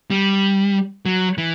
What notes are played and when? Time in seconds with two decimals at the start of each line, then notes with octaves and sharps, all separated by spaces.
0.10 G3
1.06 F#3
1.38 E3